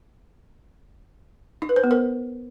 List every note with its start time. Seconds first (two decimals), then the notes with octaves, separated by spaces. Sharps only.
1.62 D#4
1.69 B4
1.76 C5
1.84 B3
1.91 A#4